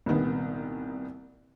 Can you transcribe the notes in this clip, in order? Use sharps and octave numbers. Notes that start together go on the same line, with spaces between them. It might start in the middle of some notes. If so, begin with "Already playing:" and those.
C2 A#2 D#3 B3